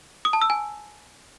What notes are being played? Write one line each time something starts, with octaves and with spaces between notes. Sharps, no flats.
D#6
A5
E6
G#5